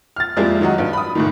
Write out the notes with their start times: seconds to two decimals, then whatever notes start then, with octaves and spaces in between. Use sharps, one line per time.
0.16 F6 A6
0.36 F2 G3 G#3 A#3 E4 F4
0.61 D#3 F#3 D#4 F#4
0.78 G2
0.93 B5 D#6
1.15 F#1 A2 D#3